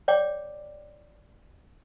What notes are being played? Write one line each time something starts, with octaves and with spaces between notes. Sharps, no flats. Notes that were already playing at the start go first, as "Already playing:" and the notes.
C#5 D5 G5 D6